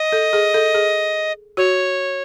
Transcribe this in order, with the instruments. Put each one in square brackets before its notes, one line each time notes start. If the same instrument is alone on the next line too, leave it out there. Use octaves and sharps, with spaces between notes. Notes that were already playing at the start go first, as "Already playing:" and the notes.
Already playing: [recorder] D#5
[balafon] A4
G#4
A4
G#4
[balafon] F#4 [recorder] C#5